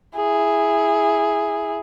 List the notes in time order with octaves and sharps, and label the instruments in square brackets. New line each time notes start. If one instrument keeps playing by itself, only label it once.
[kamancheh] E4 G#4